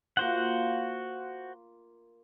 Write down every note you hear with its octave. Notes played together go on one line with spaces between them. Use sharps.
A#3 F4 F#4 C5 F#5